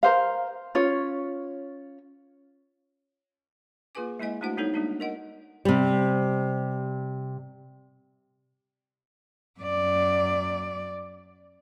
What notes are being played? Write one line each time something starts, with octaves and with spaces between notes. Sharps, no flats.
A#4 C5 F5
C#4 F4 C#5
A#3 F4 G#4 B4 G#5 D6
G#3 A#3 E4 D#5 G#5
A3 D4 E4 F#4 C5 F#5
G3 B3 D#4 A4 C#5
G3 G#3 A#3 D4 D#4
A#4 D#5 F#5
C3 G3
F#2 D5